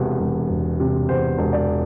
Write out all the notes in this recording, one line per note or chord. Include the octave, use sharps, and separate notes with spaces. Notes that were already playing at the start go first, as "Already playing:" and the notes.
Already playing: E1 E2 C3
E1
E1
C3
E2 C5
E1
D5